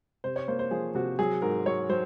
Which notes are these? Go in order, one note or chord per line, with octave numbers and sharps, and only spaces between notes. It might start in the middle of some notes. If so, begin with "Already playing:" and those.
C3 C5
C#5
A#3 C5
C5
F3 G#4
C3 F#4
F#3 G#4
G#2 A#4
F#3 C#5
F#3 C5